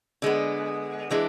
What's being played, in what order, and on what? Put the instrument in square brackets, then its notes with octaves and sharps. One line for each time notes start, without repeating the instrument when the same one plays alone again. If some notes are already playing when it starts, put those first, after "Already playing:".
[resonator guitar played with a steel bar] D3 G#3 B3
E3 G#3 D4